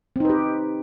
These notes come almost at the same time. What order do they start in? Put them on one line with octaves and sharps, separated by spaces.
C4 D#4 B4 G4